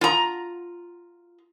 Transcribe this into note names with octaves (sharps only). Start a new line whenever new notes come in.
F4 A#5